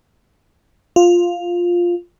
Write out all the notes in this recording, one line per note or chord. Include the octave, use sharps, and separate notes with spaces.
F4